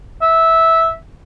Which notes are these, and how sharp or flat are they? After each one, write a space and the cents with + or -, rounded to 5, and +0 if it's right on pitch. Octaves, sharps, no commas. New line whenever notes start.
E5 -10